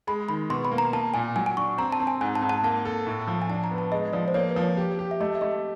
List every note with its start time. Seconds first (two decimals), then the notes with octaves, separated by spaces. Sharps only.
0.07 G#3 B5
0.29 D#3 B5
0.50 B2 C6
0.65 B5
0.71 A#3
0.78 A#5
0.93 A#3 A5
1.14 A#2 G#5
1.36 F#3 G#5
1.46 G#5
1.57 D4 C#6
1.78 C4 A#5
1.92 A5
2.00 C4
2.07 G#5
2.21 G#2 G#5
2.35 A5
2.42 G#2
2.49 A5
2.64 A#3 A5
2.85 A4
3.07 A2
3.27 F3
3.42 G#5
3.49 D4 A5
3.64 A#5
3.71 B3
3.78 A5
3.92 G#3 D#5
4.13 F3 D5
4.28 C5
4.34 A#3 C#5
4.49 B4
4.56 F3
4.63 C#5
4.77 G4
4.99 G4
5.11 E5
5.20 A3 D#5
5.35 E5
5.41 A3 D#5